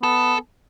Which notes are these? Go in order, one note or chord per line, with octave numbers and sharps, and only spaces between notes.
B3 A4